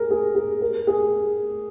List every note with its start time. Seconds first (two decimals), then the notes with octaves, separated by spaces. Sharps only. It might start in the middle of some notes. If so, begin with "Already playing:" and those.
Already playing: G#4 A#4
0.10 G#4
0.35 G#4
0.61 A#4
0.87 G#4